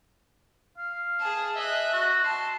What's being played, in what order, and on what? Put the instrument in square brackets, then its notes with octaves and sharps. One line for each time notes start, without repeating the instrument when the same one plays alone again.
[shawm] F5
[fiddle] G#4 A5
[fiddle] D#5 F#6 [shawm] E5
[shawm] F#4
[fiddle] A5 [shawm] C6